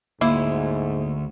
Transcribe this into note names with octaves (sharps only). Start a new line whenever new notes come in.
D2 G#2 A#3 E4